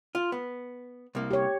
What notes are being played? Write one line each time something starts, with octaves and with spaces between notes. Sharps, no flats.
F4
B3
C2 A#3
G4 C#5